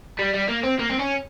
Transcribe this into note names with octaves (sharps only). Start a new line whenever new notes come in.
G3
G3
A#3
C4
A#3
C4
C#4